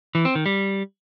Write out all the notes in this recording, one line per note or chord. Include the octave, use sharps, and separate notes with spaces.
E3
C4
D#3
G3